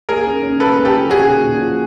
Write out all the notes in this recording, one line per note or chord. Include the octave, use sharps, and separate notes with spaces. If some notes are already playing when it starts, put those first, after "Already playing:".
A#3 G#4 A#4
C#4
C#4
A#3 A4 B4
A#3
G4 A4
F3
C#4 F#4 G#4
A#2
A#2
F3